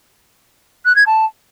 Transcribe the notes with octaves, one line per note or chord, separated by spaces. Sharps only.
F#6
G#6
A5